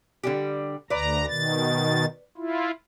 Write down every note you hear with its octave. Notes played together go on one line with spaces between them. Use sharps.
D3 G3 G4
D2 B4 D5 A#5
B2 D#3 A6
E4 F4